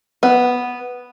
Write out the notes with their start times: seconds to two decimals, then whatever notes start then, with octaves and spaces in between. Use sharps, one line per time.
0.23 B3